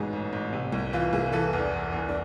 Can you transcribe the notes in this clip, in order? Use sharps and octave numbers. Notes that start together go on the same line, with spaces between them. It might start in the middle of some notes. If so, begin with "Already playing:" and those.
Already playing: A1 G#2 B2 G#4 B4
A1
A1
C3
C2
E3 F4
C2 G#4
E3 A4
E2
D4
E2
E2
D4